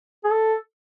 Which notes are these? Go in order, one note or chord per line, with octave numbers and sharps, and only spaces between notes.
G#4
A4